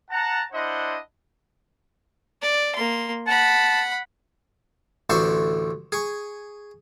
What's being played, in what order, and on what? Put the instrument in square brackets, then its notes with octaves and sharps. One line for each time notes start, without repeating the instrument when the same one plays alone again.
[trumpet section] F#5 A5 A#5
D4 E4 C5 D#5 F#5 C6
[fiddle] D5
A#3 C6
[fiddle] F#5 B5 [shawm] A5
[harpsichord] A1 D2 A4 C5 C#6
G#4 C#6